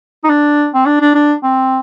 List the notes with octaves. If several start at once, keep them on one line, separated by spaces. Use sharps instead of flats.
D#4
D4
C4
D4
D4
D4
C4